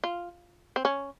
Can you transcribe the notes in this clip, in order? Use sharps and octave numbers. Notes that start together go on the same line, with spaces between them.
F4
C4
C#4